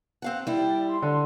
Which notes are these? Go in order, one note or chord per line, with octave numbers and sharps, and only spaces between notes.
C4 F5 F#5
G3 E4 D5 G5
C6
D3